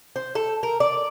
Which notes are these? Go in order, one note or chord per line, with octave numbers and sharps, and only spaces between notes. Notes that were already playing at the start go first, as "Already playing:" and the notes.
C5
A4
A#4
D5